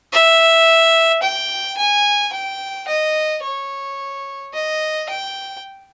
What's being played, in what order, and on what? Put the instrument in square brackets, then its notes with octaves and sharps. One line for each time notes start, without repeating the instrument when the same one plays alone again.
[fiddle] E5
G5
G#5
G5
D#5
C#5
D#5
G5